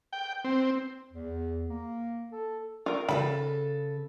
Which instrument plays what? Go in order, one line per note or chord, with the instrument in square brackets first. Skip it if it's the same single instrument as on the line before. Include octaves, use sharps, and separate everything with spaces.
[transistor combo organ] G5
C4
[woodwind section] E2
A#3
A4
[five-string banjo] F4 A#4
[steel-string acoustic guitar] C#3 A4 B4 [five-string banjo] B5